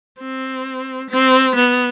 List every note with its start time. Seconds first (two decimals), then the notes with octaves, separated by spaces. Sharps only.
0.19 C4
1.09 C4
1.55 B3